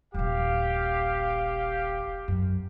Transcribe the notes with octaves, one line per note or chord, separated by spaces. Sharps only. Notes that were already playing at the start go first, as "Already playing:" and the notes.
D#1 A#1 G4 F5
F#2